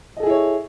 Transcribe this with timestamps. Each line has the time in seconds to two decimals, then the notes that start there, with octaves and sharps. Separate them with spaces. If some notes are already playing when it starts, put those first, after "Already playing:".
0.17 D#5
0.20 A4
0.23 G#4
0.26 E4
0.30 C#5